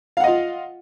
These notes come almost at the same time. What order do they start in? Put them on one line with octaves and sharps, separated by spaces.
F5 F#5 D#5 F4